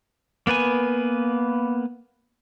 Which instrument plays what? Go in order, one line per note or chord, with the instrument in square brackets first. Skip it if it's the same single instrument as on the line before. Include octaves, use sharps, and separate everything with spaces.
[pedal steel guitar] A#3 B3 B4 G#5